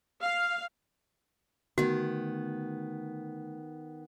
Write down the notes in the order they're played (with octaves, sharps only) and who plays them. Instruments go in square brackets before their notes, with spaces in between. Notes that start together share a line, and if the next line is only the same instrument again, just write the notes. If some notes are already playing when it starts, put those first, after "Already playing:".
[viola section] F5
[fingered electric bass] D3 A3 [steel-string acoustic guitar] D#3 B3 [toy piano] F#4